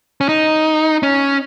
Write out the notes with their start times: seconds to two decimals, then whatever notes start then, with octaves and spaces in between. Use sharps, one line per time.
0.21 C#4
0.29 D#4
1.03 C#4